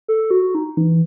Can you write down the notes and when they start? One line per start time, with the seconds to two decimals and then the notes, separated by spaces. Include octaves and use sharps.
0.08 A4
0.31 F#4
0.55 D#4
0.77 E3